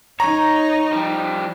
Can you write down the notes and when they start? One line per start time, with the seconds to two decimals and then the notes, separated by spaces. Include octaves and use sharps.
0.20 D#4 C#5 A#5
0.93 F3 G3